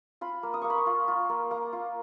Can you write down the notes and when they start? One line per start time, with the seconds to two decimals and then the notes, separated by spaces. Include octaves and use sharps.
0.21 F4 B5
0.43 A#3
0.54 D#6
0.62 A#3 C#6
0.70 B5
0.77 C#6
0.86 F4
1.08 F4
1.29 A#3
1.51 A#3 A#5
1.73 F4